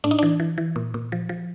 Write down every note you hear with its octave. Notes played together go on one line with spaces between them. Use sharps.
A2 D4
D#4
E3 D4
E3
E3
A#2
A#2
F3
F3